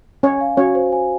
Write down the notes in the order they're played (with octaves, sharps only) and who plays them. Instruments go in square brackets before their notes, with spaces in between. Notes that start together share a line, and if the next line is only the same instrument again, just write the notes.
[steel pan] C#4 C#5 [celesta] G#5
[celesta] F5
[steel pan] C#4 C#5 [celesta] F#4
[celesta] C5
G#5